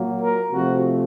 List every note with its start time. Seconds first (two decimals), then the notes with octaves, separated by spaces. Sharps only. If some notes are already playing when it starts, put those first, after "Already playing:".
Already playing: A#2 F#3 A#3
0.21 A#4
0.52 C3 F3 A3 F#4